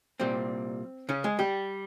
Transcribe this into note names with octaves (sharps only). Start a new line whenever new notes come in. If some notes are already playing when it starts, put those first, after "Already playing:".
C2 A#2 G3 C4
C#3 C#4
G#3 G#4
G3 G4